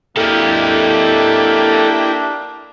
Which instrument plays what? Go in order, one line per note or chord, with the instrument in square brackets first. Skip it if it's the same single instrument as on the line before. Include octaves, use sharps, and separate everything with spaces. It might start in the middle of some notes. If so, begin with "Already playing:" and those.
[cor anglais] A#3 [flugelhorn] D4 [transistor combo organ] E4 G4 [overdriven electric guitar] A4 D#5